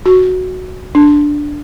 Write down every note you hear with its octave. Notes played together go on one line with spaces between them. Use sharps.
F#4
D4